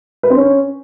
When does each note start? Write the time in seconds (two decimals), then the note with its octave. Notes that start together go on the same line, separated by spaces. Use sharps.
0.23 B4
0.30 C4
0.37 C#4